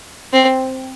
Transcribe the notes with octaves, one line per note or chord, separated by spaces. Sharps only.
C4